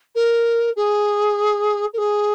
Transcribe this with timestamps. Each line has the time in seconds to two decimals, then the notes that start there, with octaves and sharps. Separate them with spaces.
0.15 A#4
0.76 G#4
1.94 A#4
1.98 G#4